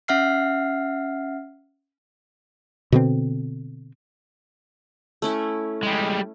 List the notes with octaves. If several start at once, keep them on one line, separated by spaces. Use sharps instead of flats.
C#4 E5 F#5 F6 C7
B2 D3 C4
A3 C#4 E4
G3 G#3